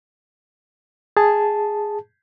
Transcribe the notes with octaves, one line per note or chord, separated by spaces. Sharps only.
G#4 A5